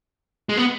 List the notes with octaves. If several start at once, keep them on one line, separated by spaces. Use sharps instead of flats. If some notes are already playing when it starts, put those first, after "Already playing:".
G#3
B3